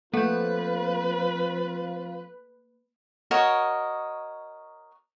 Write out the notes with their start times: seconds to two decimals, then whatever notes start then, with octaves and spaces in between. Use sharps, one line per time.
0.14 F3 A3 A#3 C4 F4 B4 G6
3.31 F#4 A#4 C#5 D#5